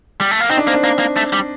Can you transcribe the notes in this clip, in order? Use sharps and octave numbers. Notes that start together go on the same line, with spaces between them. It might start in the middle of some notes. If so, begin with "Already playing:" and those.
G3
A3
A#3
C4 D#4
D4
A#3 C4
D4
A#3
A#3
A3
G3